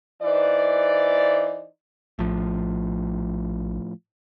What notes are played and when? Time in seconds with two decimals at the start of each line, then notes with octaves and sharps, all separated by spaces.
0.22 E3 D#4 B4 C5 D5
2.19 A#1 A2 F3